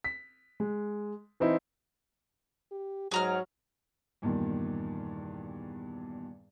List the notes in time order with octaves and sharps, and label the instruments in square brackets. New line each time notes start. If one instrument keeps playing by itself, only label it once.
[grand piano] B6
G#3
E3 C4 D#4 E4
[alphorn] G4
[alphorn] G#2 [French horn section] F#3 [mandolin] G#4 A#5 F6
[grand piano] E2 G2 A#2 D#3